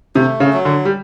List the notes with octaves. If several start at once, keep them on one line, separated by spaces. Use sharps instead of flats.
C3 A3
C#3
F#3
D3
G3